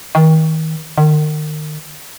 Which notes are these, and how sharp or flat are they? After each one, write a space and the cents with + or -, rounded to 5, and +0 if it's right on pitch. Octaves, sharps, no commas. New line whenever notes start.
D#3 +35
D#3 -35